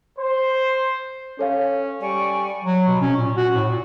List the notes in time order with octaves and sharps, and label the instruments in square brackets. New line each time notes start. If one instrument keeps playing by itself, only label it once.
[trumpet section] C5
[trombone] C#4 [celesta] A4 C#5 F5
[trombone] G3 [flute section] D5 G#5 C#6
[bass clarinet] F#3
B2
C#4
A#2
F#4
A2
A#2